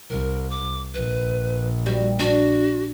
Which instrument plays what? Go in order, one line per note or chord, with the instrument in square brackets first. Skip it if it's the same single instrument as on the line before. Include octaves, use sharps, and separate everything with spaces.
[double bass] C2 [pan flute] A#4
[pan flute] D6
[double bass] A#1 [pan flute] B4
[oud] G3 [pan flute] F#4
[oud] D4 [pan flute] F#4